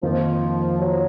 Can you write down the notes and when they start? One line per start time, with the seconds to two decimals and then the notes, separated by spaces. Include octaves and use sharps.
0.03 F2 D#3 F3 A#3
0.81 F#3